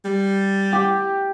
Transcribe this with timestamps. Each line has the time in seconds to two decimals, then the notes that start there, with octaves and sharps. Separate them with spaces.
0.05 G3
0.73 G4